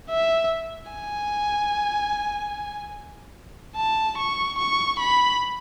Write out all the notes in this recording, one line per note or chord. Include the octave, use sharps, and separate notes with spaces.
E5
G#5
A5
C#6
C#6
B5